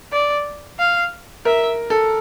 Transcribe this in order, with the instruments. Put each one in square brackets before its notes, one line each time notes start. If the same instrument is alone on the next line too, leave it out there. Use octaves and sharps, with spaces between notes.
[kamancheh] D5
F5
[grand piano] A#4 [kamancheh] E5
[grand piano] A4